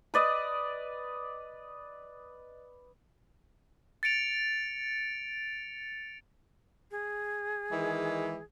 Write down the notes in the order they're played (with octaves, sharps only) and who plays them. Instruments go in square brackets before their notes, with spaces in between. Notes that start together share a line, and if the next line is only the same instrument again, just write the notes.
[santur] B4 D5 D#5
[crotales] A6 C#7 D7 F7
[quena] G#4
[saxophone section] D#3 E3 G#3